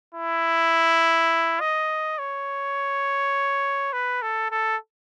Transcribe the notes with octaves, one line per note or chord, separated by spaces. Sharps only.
E4
D#5
C#5
B4
A4
A4